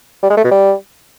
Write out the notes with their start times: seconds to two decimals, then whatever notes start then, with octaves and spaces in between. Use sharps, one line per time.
0.23 G3
0.30 G#3
0.37 A3
0.44 B2
0.51 G3